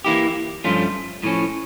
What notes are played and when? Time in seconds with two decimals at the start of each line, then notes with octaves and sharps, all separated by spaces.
0.04 E3 A#3 E4 G4
0.64 G2 F3 A3 C#4 F4
1.23 A2 F3 C#4